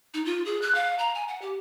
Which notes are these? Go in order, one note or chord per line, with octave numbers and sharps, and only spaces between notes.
D#4
F4
G#4
F#6
F5
A#5
G#5
F#5
G4